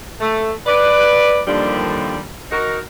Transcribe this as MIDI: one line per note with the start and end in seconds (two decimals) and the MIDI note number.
0.20 0.52 57
0.66 1.39 71
0.66 1.39 74
1.48 2.18 39
1.48 2.18 50
1.48 2.18 51
1.48 2.18 53
1.48 2.18 55
1.48 2.18 62
2.51 2.78 63
2.51 2.78 66
2.51 2.78 70